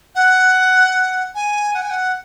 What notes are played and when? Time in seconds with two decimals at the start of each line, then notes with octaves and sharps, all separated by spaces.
0.15 F#5
1.35 G#5
1.74 F#5
1.82 G#5
1.90 F#5